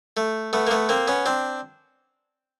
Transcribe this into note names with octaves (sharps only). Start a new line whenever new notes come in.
A3
A3 B3
A#3
A3 B3
A#3 C4
B3 C#4
C4 D4